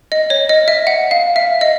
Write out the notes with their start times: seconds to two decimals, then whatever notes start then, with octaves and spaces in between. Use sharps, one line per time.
0.12 D#5
0.30 C#5
0.49 D#5
0.68 E5
0.87 F#5
1.11 F5
1.36 E5
1.61 D#5